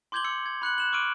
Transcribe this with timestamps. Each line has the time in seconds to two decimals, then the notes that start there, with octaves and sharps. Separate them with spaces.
0.12 C6 D6 G6 G#6 F#7 G7
0.24 E6 C#7
0.46 G#6
0.62 B5 F#6 C#7 F#7
0.78 F#6 E7 F#7
0.92 C#6 D6 E6 F6 D7 D#7